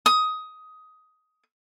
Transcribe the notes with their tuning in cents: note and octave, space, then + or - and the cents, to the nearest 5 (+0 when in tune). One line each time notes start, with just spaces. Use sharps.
D#6 +15